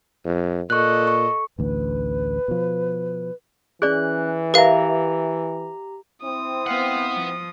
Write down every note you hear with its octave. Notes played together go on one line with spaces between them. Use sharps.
F2
A#2 A4 D#5 C#6 F#6
C#6
A1 D2 B4
B2 F3
E3 C#4 G#4 D5 F#6
G4 A#4 B4 E5 F5 A#5
C4 E4 D#6
B3 B4 F5 F#5
F3